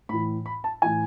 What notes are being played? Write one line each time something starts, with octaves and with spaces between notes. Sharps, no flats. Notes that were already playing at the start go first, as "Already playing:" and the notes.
A2 E3 B5
B5
A5
A2 E3 G#5